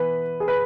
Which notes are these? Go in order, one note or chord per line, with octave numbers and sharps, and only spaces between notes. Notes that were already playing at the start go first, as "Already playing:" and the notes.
Already playing: E3 B3 B4
G#4
B4